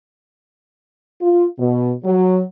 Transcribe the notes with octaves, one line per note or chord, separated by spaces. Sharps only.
F4
B2
F#3